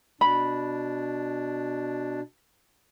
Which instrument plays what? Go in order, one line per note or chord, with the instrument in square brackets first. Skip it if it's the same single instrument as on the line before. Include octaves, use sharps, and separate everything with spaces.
[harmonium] B2 D4 [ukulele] B5